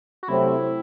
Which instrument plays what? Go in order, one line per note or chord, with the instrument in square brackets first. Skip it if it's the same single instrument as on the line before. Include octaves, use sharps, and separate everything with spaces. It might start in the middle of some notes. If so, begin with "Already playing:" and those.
[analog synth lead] F#4
[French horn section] C3 F#3 A3 C4 [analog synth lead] E4